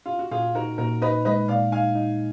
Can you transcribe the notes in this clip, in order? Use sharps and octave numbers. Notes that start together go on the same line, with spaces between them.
F4
F#4
A#2 F4 G#4
D#4 F#4 A#4
A#2 F#4 A#4
D#4 B4 D#5
G#3 B4 D#5
A#2 D5 F5
D#4 F5 G#5
D#4